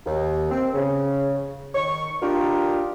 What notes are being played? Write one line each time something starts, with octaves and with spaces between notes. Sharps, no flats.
D#2
C4
C#3
D#3 C#6
D4 D#4 F4 G4 A#4